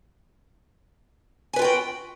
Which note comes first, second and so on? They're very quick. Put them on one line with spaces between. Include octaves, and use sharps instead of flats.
G#5 B4 F4 G5 F#4